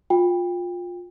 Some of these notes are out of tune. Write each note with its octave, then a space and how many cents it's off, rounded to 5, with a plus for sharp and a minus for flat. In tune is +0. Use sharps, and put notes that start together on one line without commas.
F4 +20 G5 +25